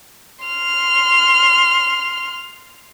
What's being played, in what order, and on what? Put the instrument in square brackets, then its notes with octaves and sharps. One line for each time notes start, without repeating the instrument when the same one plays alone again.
[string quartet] C6 F6